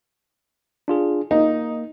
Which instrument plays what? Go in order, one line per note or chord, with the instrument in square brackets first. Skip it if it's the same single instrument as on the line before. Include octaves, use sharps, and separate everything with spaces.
[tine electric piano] D4 F4 G#4
[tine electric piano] A#3 [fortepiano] D#4